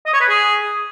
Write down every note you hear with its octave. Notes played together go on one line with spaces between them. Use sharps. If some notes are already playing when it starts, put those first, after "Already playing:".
D#5
C#5
B4
G#4